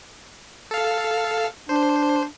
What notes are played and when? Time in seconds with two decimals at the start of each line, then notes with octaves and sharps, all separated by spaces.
0.71 A4 F5
1.69 D4 C5